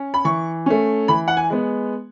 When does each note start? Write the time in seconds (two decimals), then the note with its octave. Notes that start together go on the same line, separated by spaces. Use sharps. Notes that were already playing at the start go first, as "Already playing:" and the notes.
Already playing: C#4
0.14 B5
0.25 E3 C#6
0.66 A3 C#4
1.08 E3 B5
1.28 F#5
1.37 G#5
1.50 G#3 B3